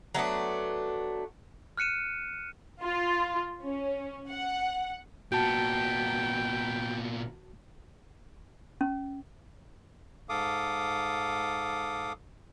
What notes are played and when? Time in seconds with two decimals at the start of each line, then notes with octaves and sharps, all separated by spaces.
0.14 F#3 A3 B3 D4
1.77 F6 F#6 C#7 D#7 E7
2.82 F4
3.63 C#4
4.29 F#5
5.32 A#2 B3 F#4 G5 A5
8.81 C#4
10.29 G#2 A4 F5 D6 D#6